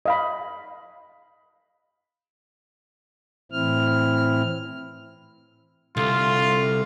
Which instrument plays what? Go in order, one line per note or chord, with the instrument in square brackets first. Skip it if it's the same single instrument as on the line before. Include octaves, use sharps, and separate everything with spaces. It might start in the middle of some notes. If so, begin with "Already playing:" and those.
[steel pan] D#5 F5 B5
[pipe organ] A2 E3 C4 E4 F6
[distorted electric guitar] C2 [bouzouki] D3 A3 [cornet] F4